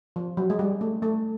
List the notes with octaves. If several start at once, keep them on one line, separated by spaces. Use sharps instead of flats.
F3
F#3
G#3
G3
A3
A3